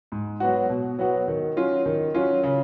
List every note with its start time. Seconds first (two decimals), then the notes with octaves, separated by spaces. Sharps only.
0.12 G#2
0.40 F#3 B3 F#4
0.69 B2
0.99 F#3 B3 F#4
1.28 D#3
1.57 F#3 C#4 F4
1.86 D#3
2.14 F#3 C#4 F4
2.43 C#3